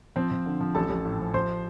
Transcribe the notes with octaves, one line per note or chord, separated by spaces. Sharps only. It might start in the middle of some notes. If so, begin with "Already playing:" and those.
F3 C4 C5
F3
D3
F3
A1 A4 A5
A1
A2
F3
F3 C5 C6